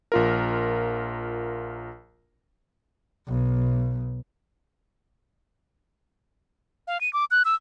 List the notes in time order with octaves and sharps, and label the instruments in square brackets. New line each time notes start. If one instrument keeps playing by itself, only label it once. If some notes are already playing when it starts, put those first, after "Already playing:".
[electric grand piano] A#1 F4 A#4
[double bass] B1
[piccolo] F5
D#7
D6
F#6
E6